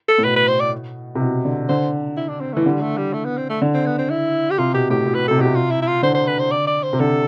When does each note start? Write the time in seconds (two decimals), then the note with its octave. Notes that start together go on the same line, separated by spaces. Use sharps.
0.08 A4
0.18 A2
0.24 B2 B4
0.36 B4
0.48 C5
0.60 D5
1.15 C3
1.20 B2
1.45 D3
1.69 D3 C5
2.17 E4
2.29 D4
2.41 C4
2.53 E3 A3
2.65 D3 G3
2.81 A3
2.97 G3
3.13 A3
3.25 B3
3.37 C4
3.49 A3
3.62 D3
3.74 C4
3.86 B3
3.98 C4
4.10 E4
4.50 G4
4.58 C3 F4
4.74 B2 G4
4.90 A2 G4
5.06 B2
5.14 B4
5.28 C3 A4
5.38 B2 G4
5.46 C3
5.55 F4
5.71 E4
5.82 E4
5.87 F4
6.02 D3 C5
6.15 C5
6.27 B4
6.39 C5
6.51 D5
6.67 D5
6.83 C5
6.93 C3
6.99 D3 A4